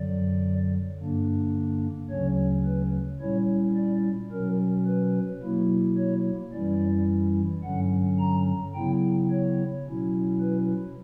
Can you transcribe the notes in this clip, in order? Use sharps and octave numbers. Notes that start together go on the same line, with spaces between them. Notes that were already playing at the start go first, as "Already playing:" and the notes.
Already playing: F#2 D3 F#3 D5
G2 D3 A#3 D4
D2 C#3 F#3 C#4 C#5
B4
A#2 G3 C#4 E4 C#5
D5
B2 F#3 C#4 A#4
B4
B2 F#3 A#3 E4
C#5
F#2 E3 G3 C#4 E4 D5
G2 D3 F#3 C#4 F#5
A#5
C#3 F#3 B3 E4 G5
C#5
B2 F#3 C#4 E4
B4